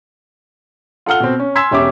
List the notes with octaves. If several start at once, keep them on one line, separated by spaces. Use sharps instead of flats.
F4 A4 F#5 F6 G7
B2 C4
C#4
G#5 C6 E6 G#6 B6 E7
E1 C#4 G4 E5 D6